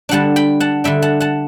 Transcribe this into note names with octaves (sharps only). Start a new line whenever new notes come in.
D3 G3 D4 F#5 A5
G5 B5
F#5 A5
D3 G3 D4 E5 G5
F#5 A5
F#5 A5